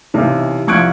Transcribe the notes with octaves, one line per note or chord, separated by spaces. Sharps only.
B1 C3 E3
C2 F3 C#6 F#6 G#6 D7